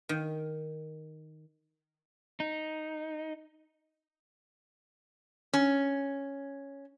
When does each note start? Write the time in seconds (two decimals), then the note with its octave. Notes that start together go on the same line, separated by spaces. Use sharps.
0.09 D#3
2.40 D#4
5.54 C#4